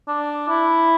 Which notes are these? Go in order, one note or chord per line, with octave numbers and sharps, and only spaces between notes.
D4
E4